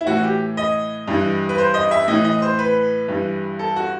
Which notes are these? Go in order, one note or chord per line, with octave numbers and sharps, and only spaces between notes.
E4
A2 E3 F#4
G4
D#5
G2 E3
B4
C5
D#5
E5
A2 E3 D#5
D#5
C5
B4
G2 E3
A4
F#4